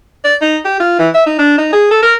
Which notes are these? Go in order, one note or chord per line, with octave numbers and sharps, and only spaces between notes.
D5
D#4
G4
F4
E3
E5
D#4
D4
D#4
G#4
A4
A#4